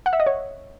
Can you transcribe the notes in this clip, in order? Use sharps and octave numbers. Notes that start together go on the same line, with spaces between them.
F#5
E5
D#5
C#5